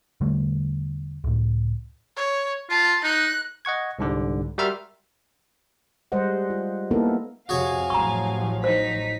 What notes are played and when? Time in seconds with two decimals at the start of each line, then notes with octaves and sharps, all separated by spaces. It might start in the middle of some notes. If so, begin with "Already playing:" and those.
0.21 E1 D3 G3 A3
1.24 C#2 A2
2.17 C#5
2.70 F4 A5
3.04 D#4 F#6
3.65 D#5 F#5 C#6 G#6
3.99 C2 G#2 D3 G3
4.58 G3 F#4 A#4 E5 C6 F6
6.12 G3 G#3 C5 D#5 F#5
6.50 F4
6.91 A#3 B3 D#4 E4 A4 A#4
7.49 F2 C3 F#4 G#4 C#5 F5 G#5
7.90 A1 F3 F#3 A#5 C#6
8.64 D#4 C5 B6